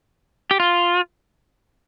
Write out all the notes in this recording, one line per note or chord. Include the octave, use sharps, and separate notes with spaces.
G4
F4